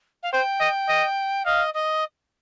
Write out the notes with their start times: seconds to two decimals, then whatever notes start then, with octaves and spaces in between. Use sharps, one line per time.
0.23 F5
0.32 C5 G5
0.60 D#5
0.88 D#5
1.45 D#5 F5
1.74 D#5